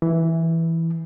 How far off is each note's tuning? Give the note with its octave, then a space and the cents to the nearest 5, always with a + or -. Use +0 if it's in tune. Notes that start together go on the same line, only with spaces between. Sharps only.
E3 -5